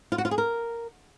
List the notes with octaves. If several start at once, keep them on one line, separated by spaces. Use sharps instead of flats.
F4
F#4
F4
G#4
A#4